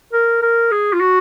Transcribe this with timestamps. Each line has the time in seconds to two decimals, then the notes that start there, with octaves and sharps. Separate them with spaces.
0.13 A#4
0.42 A#4
0.71 G#4
0.93 F4
1.00 F#4